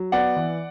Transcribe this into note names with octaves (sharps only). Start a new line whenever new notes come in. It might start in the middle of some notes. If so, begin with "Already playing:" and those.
Already playing: F#3
B3 D5 F#5
E3